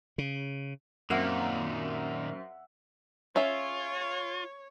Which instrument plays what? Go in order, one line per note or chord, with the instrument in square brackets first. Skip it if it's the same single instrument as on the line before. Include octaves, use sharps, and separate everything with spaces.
[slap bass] C#3
[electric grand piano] F#2 C4 [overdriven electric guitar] A#2 D#3 [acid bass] A#3 [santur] E5 F#5
[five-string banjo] C#4 G#4 E5 [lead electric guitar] F4 [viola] C#5